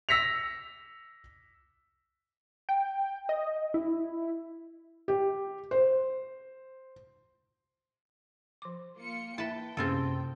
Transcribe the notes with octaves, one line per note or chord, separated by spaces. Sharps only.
E6 A#6 B6 C#7 F7
G5
D#5
E4
G4
C5
F3 D6
A#3 F4 C#7
E4 B4 E5 G5 A5
F#2 C3 A#3 C4 C#4 F4 G#4 A4